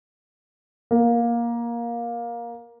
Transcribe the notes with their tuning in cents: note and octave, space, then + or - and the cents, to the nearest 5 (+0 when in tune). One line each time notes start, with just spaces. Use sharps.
A#3 +15